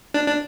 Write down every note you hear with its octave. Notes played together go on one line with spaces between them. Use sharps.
D4
D4